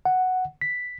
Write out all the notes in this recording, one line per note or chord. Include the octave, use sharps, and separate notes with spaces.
F#5
B6